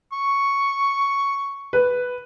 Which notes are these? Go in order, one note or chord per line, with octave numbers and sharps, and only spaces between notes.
C#6
B4